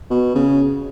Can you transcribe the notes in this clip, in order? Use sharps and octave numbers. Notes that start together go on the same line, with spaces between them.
B2
C#3